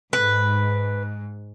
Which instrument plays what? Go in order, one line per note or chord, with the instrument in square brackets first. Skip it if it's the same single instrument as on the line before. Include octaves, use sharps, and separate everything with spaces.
[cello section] G#2 [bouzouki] B4